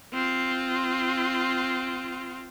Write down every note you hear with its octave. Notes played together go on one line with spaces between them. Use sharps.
C4 F4